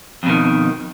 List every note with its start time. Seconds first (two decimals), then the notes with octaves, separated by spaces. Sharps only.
0.23 F2
0.26 B2
0.30 D#3